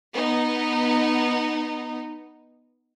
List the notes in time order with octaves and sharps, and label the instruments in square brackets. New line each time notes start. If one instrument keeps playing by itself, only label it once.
[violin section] B3 D#4